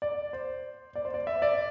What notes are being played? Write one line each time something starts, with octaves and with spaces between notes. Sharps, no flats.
D5
C5
D5
C5
D5
E5
D5